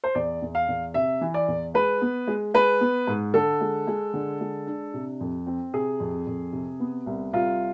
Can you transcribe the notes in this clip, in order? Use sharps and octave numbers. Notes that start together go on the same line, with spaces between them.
C5
E2 D5
E2
F5
E2
C3 E5
E3
D5
E2
G#3 B4
B3
G#3
G#3 B4
B3
G#2
D3 A4
G#3
G#3
D3
G#3
D4
C3
F2
C4
C3 G#4
F2
F2
C3
B3
C2
C2 F4